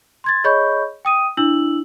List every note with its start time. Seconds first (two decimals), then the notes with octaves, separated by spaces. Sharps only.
0.24 C6 G#6 A6
0.44 G#4 C#5 D#5 B5 C#6 G6
1.05 G5 D#6 D#7
1.37 D4 E4 E6 F#7